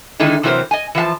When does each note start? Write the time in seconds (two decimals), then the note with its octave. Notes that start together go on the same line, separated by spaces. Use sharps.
0.19 D3 D#3 G#3 D#4 E4
0.43 C3 E3 F#3 D#4 A#4 C5
0.71 D#5 G#5
0.95 E3 F3 F5 A5